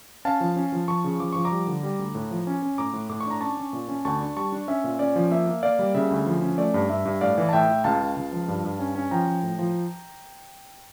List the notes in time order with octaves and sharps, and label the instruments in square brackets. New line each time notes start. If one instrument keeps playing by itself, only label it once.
[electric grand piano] C#4 F5 A5
F3
C#4
F3
F3 A5 C#6
C#3
F3 D6
F3 C#6
A#5 D6
G3
D3
G3
D2
A2
F3
C#4
C#4
A2 A#5 D6
A2
A2 D6
C#6
D4 A#5
C#4 A5 C#6
C#4
A#2
C#4
D2 A5 C#6
D4
G3 A5 C#6
D4
C#4 E5
A#2
C#4 D5
F3
A#3 E5
A#3
A#3 D5 F5
G3
C#3 E5
D2
F3
C#4
A3 D5
G2
G2 E5
G2
A2 D5 F5
E3
A5
A2 E5 G5
A2
C#2 F5 A5
C#2
C#2
F3
G2
G2
C#4
C#4
F3 G5 A#5
F3
A2
F3